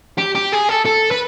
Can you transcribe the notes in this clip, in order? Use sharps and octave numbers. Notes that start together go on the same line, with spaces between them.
G4
G4
G#4
A4
A4
B4